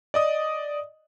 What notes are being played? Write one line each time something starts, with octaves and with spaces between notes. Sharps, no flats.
D5 D#5 D#6